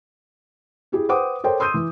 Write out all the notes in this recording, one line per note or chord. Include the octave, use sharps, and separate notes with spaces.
E4 G4 G#4
B4 C5 F#5 G5 D6 D#6
A4 A#4 C5 C#5 G5
C6 D#6 E6 G6 D#7
E3